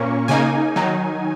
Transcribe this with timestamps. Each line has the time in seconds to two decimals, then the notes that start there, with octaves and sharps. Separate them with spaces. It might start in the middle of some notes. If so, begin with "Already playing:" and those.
Already playing: A#2 A#3 C#4 C#6
0.28 C#3 A#3 D#4 G#5
0.76 D#3 F#3 D#4